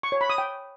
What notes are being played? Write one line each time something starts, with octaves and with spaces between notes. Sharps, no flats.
C#6
C#5
B5
D#6
G5